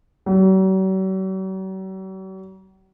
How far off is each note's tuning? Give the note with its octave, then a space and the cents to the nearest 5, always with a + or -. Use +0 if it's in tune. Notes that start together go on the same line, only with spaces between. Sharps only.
F#3 +45